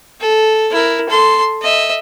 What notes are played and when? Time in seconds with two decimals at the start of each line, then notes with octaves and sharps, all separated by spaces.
0.21 A4
0.71 E4 A#4
1.09 A4 C6
1.62 D#5 E5